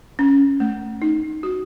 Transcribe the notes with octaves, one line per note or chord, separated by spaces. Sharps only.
C#4
A3
D#4
F#4